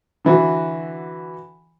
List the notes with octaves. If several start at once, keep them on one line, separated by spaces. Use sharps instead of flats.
D3 E3 F#4